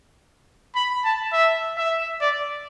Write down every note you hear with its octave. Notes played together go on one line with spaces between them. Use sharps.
B5
A5
E5
E5
D5